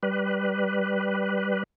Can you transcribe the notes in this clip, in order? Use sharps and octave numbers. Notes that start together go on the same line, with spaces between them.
G3 B4